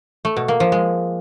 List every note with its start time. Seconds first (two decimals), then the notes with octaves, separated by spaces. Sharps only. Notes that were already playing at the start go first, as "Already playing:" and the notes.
0.25 A3
0.37 B2
0.48 A#3
0.60 F3
0.72 G#3